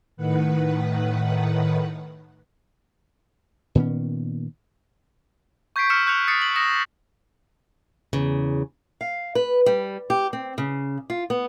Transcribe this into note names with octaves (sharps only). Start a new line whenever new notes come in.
A2 D#3 B4 F#5
A#2 D#3 B3 C#4
C#6 G6 G#6 B6 C7 D7
E6 F6 G6 B6 C#7 E7
C#6 F#6 G6 C#7 F7
D#6 A6 C7 C#7
F#7
D#6 A#6 C#7 E7
E2 C#3
F5
B4
G3
G4
C4
C#3
F4
B3